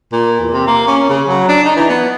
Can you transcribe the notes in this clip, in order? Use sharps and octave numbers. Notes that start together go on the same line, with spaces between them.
A#2
E2
C3
A#3
C#4
C#3
F#3
D4
D#4
E3
B3